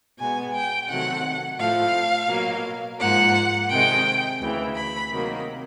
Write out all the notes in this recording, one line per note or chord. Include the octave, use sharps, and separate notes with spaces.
B2 G#3 B3 G#5
G5
C3 D#3 F#3 A3 F#5
A2 F3 A3 F5
B2 F#3 A#3
G#2 F3 A#3 F#5
C3 D#3 G#3 G5
D2 C#3 E3
B5
C3 D#3 F#3 A#3